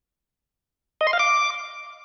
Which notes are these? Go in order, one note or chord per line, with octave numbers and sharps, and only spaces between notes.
D#5
C6
F5
D6